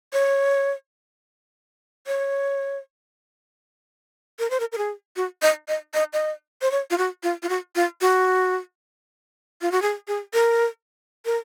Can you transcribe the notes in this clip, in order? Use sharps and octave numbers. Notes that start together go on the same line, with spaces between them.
C#5
C#5
A#4
C5
A#4
A#4
G#4
F#4
D#5
D#5
D#5
D#5
C5
C#5
F4
F#4
F4
F4
F#4
F4
F#4
F4
F#4
G#4
G#4
A#4
A#4